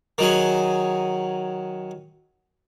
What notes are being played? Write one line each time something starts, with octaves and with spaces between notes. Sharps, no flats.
D#3 F#3 G#4